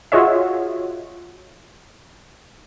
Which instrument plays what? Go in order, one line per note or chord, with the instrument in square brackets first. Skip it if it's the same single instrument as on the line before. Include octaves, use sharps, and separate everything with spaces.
[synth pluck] F4 F#4 G#4 C#5 D#5 E5